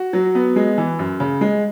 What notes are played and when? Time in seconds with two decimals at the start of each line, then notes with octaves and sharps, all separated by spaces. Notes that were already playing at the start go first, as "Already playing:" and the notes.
Already playing: F#4
0.13 F#3
0.35 B3
0.56 G#3
0.78 E3
0.99 F#2
1.20 C#3
1.41 G#3